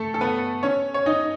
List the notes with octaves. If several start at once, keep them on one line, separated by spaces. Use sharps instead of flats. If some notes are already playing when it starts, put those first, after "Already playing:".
Already playing: A3 A4
A4
B3 B4
C#4 C#5
C#5
D#4 D#5